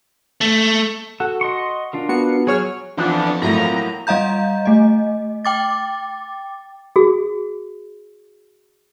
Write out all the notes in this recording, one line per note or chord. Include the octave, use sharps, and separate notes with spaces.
A3
F#4 A4
D#5 C6 C#6
D4 F4 A#4
B3 F#4 C#7
F#3 G#4 C#5 F6
F2 E3 F3 B3 D4
A2 F#3 A3 A#3 A#5 A#6
G3 D#5 F5 A#5 G6
A3 D#5
G5 D6 A6
F#4 G#4